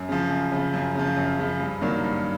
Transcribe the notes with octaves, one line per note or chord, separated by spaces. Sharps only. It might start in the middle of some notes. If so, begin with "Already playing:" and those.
Already playing: F#2
C#3 F3
F#2
C#3 F3
F#2
C#3 F3
F#2
C#3 F3
G2
D#3 F#3 A#3 D4
G2